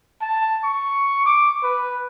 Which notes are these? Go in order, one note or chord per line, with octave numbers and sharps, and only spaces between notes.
A5
C#6
D6
B4